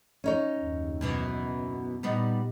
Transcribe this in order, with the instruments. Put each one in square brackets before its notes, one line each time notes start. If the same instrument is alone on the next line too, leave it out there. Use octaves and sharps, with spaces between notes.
[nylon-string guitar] C#4 D#4 C#5
[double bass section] F#1 D#2
[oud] F#2 B2 E3
[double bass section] B3
[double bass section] A#2 [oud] G3 B3 D#4